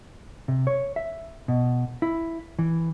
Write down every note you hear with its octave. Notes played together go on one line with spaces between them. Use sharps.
C3
C#5
E5
B2
E4
E3